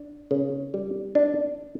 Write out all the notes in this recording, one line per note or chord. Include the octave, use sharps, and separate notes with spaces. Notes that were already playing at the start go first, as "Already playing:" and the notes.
Already playing: D4
C#3
G3
D4